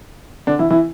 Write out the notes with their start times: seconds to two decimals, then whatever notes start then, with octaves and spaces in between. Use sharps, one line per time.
0.47 D3 D4
0.59 E3 E4
0.70 E3 E4